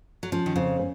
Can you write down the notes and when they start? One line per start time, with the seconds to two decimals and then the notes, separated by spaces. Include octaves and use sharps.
0.23 F#3
0.32 F3 C#4
0.46 D#3
0.55 F2 C#3
0.79 C#4